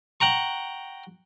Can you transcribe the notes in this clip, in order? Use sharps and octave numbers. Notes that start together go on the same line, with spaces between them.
F#5 G5 A#5 C#6